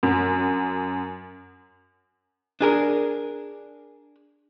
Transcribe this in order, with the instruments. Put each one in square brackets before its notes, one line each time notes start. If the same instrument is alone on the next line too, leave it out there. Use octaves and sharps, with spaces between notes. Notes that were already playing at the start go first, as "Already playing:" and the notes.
[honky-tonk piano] F#2
[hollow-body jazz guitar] D4 G#4 A#4